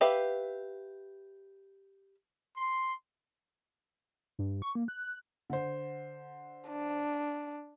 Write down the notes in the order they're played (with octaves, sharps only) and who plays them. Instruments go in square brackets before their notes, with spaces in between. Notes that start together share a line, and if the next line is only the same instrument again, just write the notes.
[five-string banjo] G4 B4 E5 F5
[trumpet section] C6
[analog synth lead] G2
C#6
A#3
F#6
[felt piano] D3 C5
[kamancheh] D4